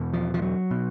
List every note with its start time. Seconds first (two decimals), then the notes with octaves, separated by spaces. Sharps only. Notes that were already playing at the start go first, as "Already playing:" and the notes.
Already playing: E2 B2
0.13 F3
0.34 F3
0.42 F#3
0.71 B2